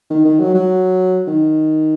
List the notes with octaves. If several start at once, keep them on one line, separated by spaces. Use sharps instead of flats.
D#3
D#3
F#3
F#3
D#3